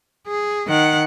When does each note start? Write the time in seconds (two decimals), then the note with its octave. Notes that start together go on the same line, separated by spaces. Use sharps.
0.28 G#4
0.67 D#3 F#5